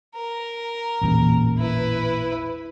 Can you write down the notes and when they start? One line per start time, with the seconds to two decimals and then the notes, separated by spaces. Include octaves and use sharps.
0.15 A#4
1.01 A1 E2 A#2
1.58 E4 B4